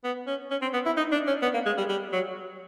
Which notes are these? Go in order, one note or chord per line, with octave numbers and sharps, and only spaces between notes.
B3
C#4
C#4
C4
B3
E4
D#4
D4
C#4
B3
A#3
G#3
G3
G3
F#3